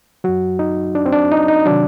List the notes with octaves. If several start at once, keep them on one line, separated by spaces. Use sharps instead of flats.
F#2 F#3 F#4
D#4
D4
C4
D4
D#4
D#4
C3 D#3 F#3 D4